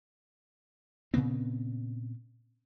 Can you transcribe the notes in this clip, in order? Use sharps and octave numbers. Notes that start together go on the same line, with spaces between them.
A#2 C#3 B3 C4